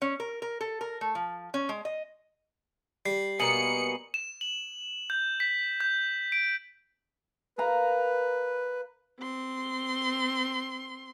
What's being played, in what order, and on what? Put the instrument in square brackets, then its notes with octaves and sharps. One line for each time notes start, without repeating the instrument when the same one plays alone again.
[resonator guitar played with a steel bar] C#4
A#4
A#4
A4
A#4
A3
F3
C#4
G#3
D#5
[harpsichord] G3 [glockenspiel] C7
[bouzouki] B2 A#3 B3 [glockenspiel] G#5 D#7 F#7 [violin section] C#7
[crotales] E7
F#7
G6
B6
G6
D7
[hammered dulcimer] A#4 F5 A#5 [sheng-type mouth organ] B4
[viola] C4 C6